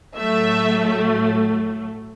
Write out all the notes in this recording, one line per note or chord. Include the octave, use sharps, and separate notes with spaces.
A2 F#3 A3 E5